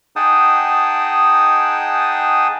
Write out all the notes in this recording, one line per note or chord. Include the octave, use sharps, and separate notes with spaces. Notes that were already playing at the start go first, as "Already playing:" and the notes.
D#4 G#4 F#5 G5 A5 D#6